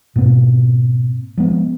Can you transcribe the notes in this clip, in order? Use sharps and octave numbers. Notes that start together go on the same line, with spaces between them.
G#2 B2 A#3 C4
F3 G#3 B3